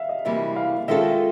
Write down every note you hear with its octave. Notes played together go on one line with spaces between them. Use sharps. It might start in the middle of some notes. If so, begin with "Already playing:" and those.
Already playing: E5 F5
D#5
D2 C3 E3 G3 A#3 E5
F5
D#3 G#3 C#4 F4 A4 E5